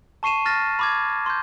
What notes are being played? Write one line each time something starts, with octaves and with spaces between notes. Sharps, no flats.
A5 C#6 C7 D#7 E7
F6 A6 A#6
B5 D6 G#6
C6 G6